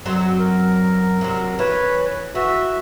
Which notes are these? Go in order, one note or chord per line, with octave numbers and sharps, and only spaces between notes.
F#2 F#3 C4
A#4
C3 F#3
E3 B4 C#5
E3 F#4 E5